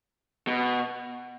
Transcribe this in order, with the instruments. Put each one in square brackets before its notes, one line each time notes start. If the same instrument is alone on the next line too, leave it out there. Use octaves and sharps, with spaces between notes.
[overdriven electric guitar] B2